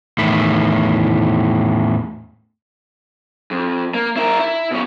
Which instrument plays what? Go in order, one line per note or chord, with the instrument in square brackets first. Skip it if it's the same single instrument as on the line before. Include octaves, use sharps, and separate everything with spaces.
[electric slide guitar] E2 A2 D#3 E4
[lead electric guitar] F2
A#3
E4 A#4
E4
B2 C#4